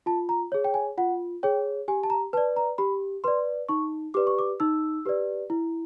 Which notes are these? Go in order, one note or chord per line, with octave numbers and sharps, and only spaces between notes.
F4 A5
A#5
G#4 C#5
G5
G#5
F4 F#5
G#4 C#5 G5
G4 G#5
A5
A#5
B4 D5 A5
A#5
G4 B5
B4 D5 C6
D#4 C#6
G4 B4 D5 D6
C#6
D6
D#4 E6
G4 B4 D5
E4